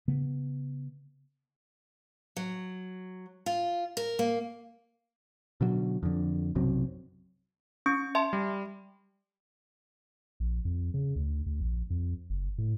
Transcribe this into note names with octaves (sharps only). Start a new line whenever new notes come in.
C#3 B3
F#3
F4
A#4
A#3
B2 D3 F#3
F2 D3
B1 F#2 C3 F#3
C#4 C#6
E5 A5 C6
G3
A#1
F2
C#3
D2
D2
A#1
F2
F#1
A2